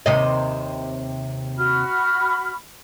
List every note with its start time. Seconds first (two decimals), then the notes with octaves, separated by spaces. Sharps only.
0.06 D#2 C3 D#5
1.57 F#4 B5 F6